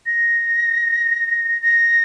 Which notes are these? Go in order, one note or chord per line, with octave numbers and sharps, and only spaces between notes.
A#6
A#6